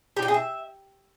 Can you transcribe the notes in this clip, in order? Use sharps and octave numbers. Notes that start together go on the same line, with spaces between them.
G4
G5
G#4
E5